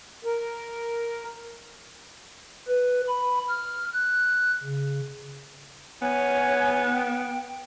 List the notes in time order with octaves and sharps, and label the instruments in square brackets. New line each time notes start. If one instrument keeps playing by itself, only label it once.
[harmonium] A#4
[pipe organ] B4
B5
F6
F#6
C#3
[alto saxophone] B3 [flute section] C#5 G#5
[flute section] G5